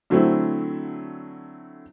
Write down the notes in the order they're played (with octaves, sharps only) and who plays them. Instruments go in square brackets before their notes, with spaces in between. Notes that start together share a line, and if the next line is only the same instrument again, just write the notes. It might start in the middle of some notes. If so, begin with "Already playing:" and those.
[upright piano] D3 F#3 A3 C4 E4